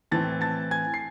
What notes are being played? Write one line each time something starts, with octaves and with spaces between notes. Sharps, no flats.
A2 E3 C4 A5 A6
A5 A6
G#5 G#6
C7